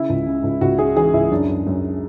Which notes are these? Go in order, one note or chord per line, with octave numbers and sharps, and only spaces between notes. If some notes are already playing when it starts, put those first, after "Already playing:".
Already playing: C#3 E4
C#2
C#3
C#2
C#2 F#4
C#3 G#4
E3 G#4
C#2 E4
F#2 D4
F#2
F#2